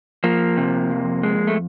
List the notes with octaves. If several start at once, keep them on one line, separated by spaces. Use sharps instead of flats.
F3 A#3
C3
F2
G#3
A3